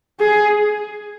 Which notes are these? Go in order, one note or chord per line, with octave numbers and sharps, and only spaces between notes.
G#4